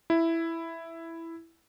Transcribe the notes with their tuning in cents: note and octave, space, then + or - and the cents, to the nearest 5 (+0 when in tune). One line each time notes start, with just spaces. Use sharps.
E4 +5